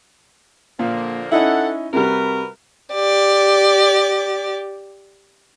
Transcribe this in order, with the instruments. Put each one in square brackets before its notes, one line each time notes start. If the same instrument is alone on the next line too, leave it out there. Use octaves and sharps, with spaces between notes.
[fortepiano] A#2 [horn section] D3 F3 A#3
[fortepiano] C#4 D#4 E4 [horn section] A4 F#5
[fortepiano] C3 G3 [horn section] F#4 A#4 B4
[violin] G4 D5